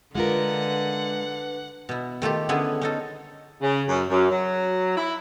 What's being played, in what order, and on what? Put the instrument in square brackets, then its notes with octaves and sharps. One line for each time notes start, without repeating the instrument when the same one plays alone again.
[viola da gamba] D3 [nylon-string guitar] G#3 F4 A#4 [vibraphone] D4 B4 [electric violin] F#5
[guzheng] B2 E4
D#3 A3 F4 G4
D3 B3 C#4 E4 G#4
C#4 D#4 A4
[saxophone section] C#3
F#2
F#2
F#3
E4